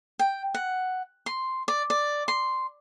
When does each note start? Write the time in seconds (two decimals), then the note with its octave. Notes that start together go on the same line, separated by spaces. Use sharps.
0.19 G5
0.55 F#5
1.26 C6
1.68 D5
1.90 D5
2.28 C6